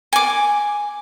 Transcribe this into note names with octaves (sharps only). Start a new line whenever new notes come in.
G#5 D6